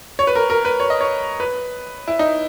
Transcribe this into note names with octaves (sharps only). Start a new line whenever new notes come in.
C#5
B4
A#4
A#4
B4
C#5
D#5
C#5
B4
E4
D#4